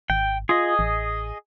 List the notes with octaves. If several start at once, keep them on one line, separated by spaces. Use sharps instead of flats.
G#1 G5
F4 G#4 D#5
A1